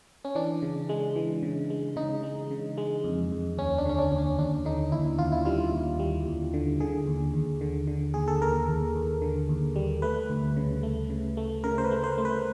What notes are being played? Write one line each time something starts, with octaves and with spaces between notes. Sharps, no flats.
C#4
E3 D4
C#3
G#3
E3
C#3
G#3
C#3 D#4
G#3
C#3
G#3
F2
F2
D#2 C#4
D4
D3 C#4
D4
D#2
C#4
D#2 D4
D3 D#4
D#2 E4
D#2 F4
E4
G3 F4
D#2
G3
D#2
D3
D3 G#4
D#2
D#2
D3
D3
D#2 G#4
A4
D#2 A#4
D#2
D#2
D3
D#2
G3
A3 B4
D2
C#3
A3
C#3
A3
C#3 A#4
C5
B4
A3
C5
A3
B4